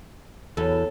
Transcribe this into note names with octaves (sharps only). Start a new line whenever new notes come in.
E2 B2 F#3 A4